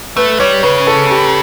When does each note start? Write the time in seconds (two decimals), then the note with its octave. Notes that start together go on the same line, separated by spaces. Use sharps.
0.17 A3 B4
0.40 G3 C#5
0.63 C#3 B4
0.87 A4
1.10 G4